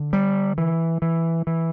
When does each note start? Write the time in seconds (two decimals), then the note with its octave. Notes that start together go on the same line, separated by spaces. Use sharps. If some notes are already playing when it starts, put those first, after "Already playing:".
Already playing: D3
0.13 G3
0.58 E3
1.02 E3
1.47 E3